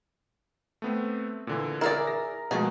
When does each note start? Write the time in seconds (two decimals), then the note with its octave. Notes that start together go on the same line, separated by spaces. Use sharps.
0.82 A3 B3 C4
1.47 A#2 D3 E3
1.81 E4 G#4 A#4 D5
2.07 A#6
2.51 B2 F3 G#3 A3 G#4